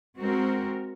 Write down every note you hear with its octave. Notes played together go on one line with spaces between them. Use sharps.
G#3 C4 F#4 A#4